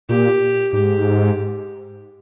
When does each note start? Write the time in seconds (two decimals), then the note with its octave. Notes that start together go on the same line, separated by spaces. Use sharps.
0.09 A#2 G4
0.73 G#2 G4